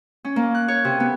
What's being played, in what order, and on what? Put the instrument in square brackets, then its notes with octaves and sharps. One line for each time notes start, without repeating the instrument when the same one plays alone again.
[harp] C#4
A#3
F#6
C#5
C3
B3